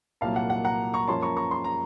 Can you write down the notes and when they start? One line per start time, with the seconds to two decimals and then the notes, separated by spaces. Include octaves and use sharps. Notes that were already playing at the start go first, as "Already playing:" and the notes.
0.21 C2 A#2 F#3 A#3 F5 A5
0.36 F#5
0.50 F#5
0.64 F#5 A#5
0.94 A#5 C#6
1.07 F#2 F3 A#3 C#4 A5 C6
1.22 A#5 C#6
1.37 A#5 C#6
1.51 C6
1.64 A#5